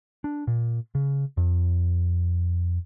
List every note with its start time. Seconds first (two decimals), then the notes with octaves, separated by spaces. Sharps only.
0.24 D4
0.47 A#2
0.95 C#3
1.37 F2